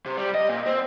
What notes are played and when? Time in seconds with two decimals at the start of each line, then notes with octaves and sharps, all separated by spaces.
0.06 C3
0.17 G3
0.35 D#5
0.49 A#2
0.66 C4